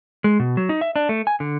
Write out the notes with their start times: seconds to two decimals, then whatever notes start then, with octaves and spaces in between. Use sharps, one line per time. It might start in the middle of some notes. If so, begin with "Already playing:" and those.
0.24 G#3
0.40 B2
0.57 F#3
0.69 D#4
0.81 E5
0.96 D4
1.09 A3
1.27 G#5
1.40 D3